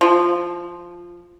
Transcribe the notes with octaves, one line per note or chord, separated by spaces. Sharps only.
F3